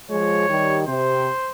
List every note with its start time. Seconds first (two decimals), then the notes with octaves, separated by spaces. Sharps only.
0.10 F3 G#3 C#5
0.49 D#3 G3
0.87 C3 C5